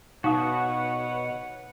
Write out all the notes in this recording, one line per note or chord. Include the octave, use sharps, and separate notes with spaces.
B2 D#4 F#4 B4 C#5 F5 F#5 D#6